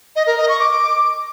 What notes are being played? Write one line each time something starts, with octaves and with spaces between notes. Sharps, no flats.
D#5
A#4
D#5
C#6
D6